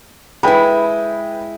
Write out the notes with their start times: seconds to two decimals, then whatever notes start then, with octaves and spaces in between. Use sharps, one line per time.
0.43 G#3 E4 B4 G5 B5